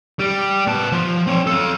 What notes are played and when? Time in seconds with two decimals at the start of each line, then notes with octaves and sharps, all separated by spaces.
0.19 G3
0.67 B3 A5
0.92 F3
1.27 C4 C#5
1.47 A4 F5